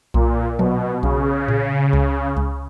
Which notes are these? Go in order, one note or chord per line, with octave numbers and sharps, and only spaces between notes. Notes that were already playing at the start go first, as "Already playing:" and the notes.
B1 A#2
B2 F#3
B1 C#3
A#2
C#2
C#2